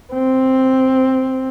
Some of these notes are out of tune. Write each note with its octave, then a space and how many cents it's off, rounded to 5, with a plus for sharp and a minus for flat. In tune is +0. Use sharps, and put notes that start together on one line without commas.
C4 +0